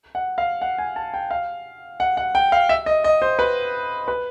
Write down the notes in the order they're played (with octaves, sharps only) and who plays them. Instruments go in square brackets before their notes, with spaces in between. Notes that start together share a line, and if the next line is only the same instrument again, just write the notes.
[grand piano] F#5
F5
F#5
G#5
A5
G5
F5
F#5
F#5
G5
F5
E5
D#5
D#5
C5
B4
B4